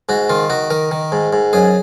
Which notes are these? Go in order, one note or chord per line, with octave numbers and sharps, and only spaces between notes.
G#2 F#4
D#3 F4
D#3 F#4
D#3 A#4
D#3
G#2
G#2
F#2 G#4